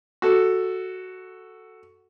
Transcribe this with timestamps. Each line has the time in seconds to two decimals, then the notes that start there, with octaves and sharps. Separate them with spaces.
0.22 F#4 A4